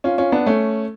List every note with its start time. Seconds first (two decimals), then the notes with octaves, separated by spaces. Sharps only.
0.04 C#4 F4
0.18 C#4 F4
0.32 B3 D4
0.46 A3 C#4